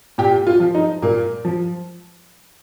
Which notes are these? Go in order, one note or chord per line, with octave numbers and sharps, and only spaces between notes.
A#2 G4
F4
F3
D#4
A#2 A#3
F3